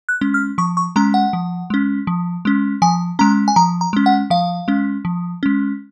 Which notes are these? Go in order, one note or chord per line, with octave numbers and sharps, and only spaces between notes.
F#6
G#3 C#4
F6
F3 C#6
C#6
G#3 C#4 A#5
F#5
F3
G#3 C#4
F3
G#3 C#4
F3 G#5
G#3 C#4 A#5
G#5
F3 A#5
A#5
G#3 C#4
F#5
F3 F5
G#3 C#4
F3
G#3 C#4